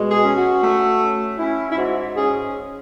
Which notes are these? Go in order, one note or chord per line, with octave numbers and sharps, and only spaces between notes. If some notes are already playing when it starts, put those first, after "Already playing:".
Already playing: B2 G#3
G#4
C#4
F#4
A3
C#4
C#4 E4
E4
G#2 F#4
C#4 G#4